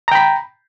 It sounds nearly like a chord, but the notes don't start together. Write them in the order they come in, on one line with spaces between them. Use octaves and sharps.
A#5 G5 B5